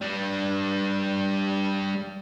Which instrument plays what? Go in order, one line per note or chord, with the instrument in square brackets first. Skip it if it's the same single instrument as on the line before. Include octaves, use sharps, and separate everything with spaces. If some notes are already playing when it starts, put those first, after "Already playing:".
[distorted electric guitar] G3 D4